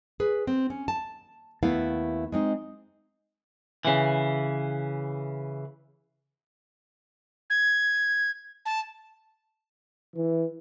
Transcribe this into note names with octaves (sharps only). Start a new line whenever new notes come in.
G#4 B4
C4
C#4
A5
D#2 A3 B3 E4 F5
G#3 C4 D#4
C#3 E3
G#6
A5
E3